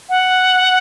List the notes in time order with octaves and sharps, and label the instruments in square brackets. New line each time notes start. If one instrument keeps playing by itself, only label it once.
[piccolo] F#5